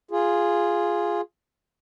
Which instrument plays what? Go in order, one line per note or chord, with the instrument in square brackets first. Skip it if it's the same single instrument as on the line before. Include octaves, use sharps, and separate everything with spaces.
[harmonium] F4 G#4